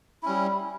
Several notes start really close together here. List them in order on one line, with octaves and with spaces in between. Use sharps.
E4 C#4 G3